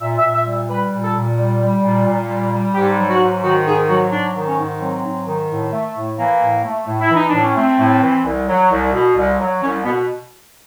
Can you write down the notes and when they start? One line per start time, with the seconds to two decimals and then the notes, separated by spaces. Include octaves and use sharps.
0.01 A#2 E5
0.18 E5
0.24 A#2
0.34 E5
0.47 G3
0.53 E5
0.70 G3 B4
0.93 A#2
1.03 A4
1.16 A#2
1.38 G3
1.61 G3
1.83 A#2
2.07 A#2
2.30 G3
2.53 G3
2.75 G#2 G4
2.98 F#3
3.10 F#4
3.21 G#2
3.44 D#3 F#4
3.68 G#2 G#4
3.89 F#3 F#4
4.12 G#2 D4
4.35 D#3
4.47 C#4
4.59 G#2
4.82 F#3 C4
5.05 G#2
5.27 D#3
5.50 A2
5.73 A3
5.97 A2
6.19 E3 A#3
6.42 A2
6.64 A3
6.87 A2
7.01 E4
7.10 E3 D#4
7.29 A2 D4
7.43 C#4
7.57 A3 C4
7.79 A2
8.03 E3
8.25 C2
8.49 F#3
8.71 C2
8.93 B2
9.16 C2
9.40 F#3
9.62 C2 C#4
9.85 B2 B3